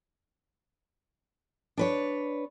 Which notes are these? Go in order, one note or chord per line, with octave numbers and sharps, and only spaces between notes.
D4 B4 C#5